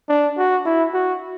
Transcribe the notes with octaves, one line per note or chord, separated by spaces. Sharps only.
D4
F#4
E4
F#4